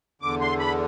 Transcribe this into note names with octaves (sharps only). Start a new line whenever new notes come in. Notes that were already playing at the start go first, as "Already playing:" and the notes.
E2 D3 D6
C6
B5